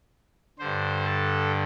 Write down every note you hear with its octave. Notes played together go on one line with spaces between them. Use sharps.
G2 D3 C5
A4